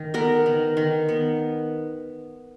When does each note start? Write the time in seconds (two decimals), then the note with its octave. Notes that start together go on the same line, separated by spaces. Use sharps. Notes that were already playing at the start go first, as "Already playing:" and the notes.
Already playing: D#3
0.14 B3 A#4
0.46 D#3
0.77 D#3
1.09 B3